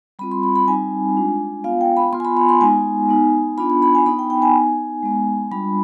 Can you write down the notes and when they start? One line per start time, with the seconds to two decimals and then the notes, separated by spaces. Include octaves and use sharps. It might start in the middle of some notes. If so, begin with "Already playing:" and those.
0.19 G3 C4 F4 B5
0.31 C6
0.43 B5
0.55 B5
0.67 G3 C4 D#4 G#5
1.16 G#3 D4 F4
1.64 B3 F4 F5
1.81 G5
1.97 B5
2.13 B3 F4 C6
2.20 G#5
2.25 B5
2.37 B5
2.49 C6
2.61 G#3 B3 D#4 G#5
3.09 B3 D#4
3.58 B3 D4 F4 B5
3.70 B5
3.82 B5
3.95 G#5
4.06 B3 D#4 B5
4.19 G5
4.30 G5
4.42 G#5
4.55 B3 D#4
5.03 G#3 B3 D#4
5.51 G3 D4 F4 B5